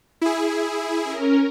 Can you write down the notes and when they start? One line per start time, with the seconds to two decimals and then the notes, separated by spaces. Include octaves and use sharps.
0.22 E4 G#4
1.03 C#4 A#4